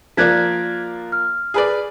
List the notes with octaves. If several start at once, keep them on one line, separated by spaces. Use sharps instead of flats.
F3 A#3 D5 F#6 G#6 B6
F6
G#4 B4 D5